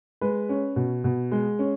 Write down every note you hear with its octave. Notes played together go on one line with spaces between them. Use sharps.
G#3 B4
C#4
B2
B2
G#3
C#4